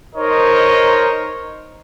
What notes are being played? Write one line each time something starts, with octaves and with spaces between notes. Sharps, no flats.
D#4 A#4 C5 C#5 D#5